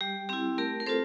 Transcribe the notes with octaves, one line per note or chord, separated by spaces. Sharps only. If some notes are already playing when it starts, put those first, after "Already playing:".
G3 G4
C4 E4 G4
A3 G4 A#4
A#4
C4 F4 A4 C5